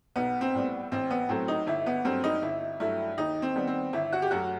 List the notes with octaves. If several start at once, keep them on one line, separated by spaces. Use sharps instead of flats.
B1 B3
C4
A2 G3 B3
A1 C4
B3
A2 F#3 A3 C4
D#4
G1 E4
B3
G2 F#3 A3 C4
D#4
G1 E4
G2 F#3 A3 E4
D#2 D#4
C4
D#3 G3 B3
C4
G1 E4
F#4
G4
F#2 F#3 A3 F#4